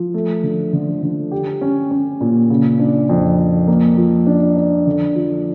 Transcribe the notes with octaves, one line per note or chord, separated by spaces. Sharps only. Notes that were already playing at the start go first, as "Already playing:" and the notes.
Already playing: F3
A3
D3
D3
D3
G4
C#4
C#4
A#2
C#3
D4
F2
F2
A#3
F3
D4
D4
D3
F3